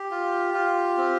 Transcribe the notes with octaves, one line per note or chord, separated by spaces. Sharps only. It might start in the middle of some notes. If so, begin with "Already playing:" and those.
Already playing: G4
F4
F4
C4